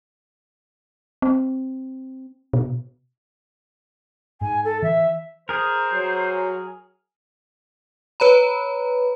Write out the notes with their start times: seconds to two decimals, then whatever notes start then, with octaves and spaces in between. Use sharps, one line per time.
1.22 C4
2.53 B2
4.41 G#2 G#5
4.64 A4
4.83 E3 E5
5.49 G#4 A#4 C5
5.93 F#3
8.20 B4 C#5 A#5 B5